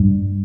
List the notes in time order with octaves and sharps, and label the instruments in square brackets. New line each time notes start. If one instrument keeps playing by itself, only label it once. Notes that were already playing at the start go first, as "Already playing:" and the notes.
Already playing: [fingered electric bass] G2